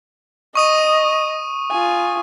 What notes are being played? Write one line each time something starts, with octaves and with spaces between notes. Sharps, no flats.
D#5 C#6 D#6 D#7
F4 G#5